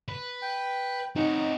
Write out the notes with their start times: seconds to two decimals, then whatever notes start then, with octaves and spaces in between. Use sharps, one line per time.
0.08 B4
0.42 G5
1.16 C4 C#4 D#4 F#5